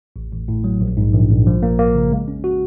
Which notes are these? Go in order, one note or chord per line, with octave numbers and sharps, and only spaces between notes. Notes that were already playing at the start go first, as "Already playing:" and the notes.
A1
A1
A2
F#3
A#1
G#2
A#1
A#1
F3
A#3
A#3
C#3
G#3
C#4
F#4